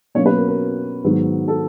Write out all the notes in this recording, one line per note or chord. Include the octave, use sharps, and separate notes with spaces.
B2 F#3 A#3 C#4 C#5
B4
A#4
A#4
G#2 D#3 F#3 B3
A4